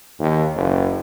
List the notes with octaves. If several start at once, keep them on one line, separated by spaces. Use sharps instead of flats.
D#2
F#1